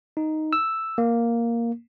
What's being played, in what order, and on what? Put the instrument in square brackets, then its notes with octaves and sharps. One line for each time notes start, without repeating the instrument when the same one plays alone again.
[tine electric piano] D#4
E6
A#3